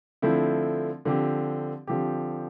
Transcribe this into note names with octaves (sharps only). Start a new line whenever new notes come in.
D3 F3 A3 C4 E4
D3 F3 C4 G4
D3 F3 C4 G4